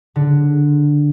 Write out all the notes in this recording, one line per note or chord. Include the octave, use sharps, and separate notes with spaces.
D3